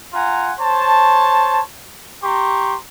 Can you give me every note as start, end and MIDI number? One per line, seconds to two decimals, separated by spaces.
0.14 0.53 65
0.14 0.53 78
0.14 0.53 80
0.14 0.53 82
0.60 1.62 72
0.60 1.62 73
0.60 1.62 81
2.24 2.77 67
2.24 2.77 82
2.24 2.77 84
2.24 2.77 85